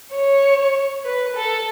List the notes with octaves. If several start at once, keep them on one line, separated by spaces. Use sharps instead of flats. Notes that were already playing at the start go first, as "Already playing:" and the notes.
C#5
B4
A4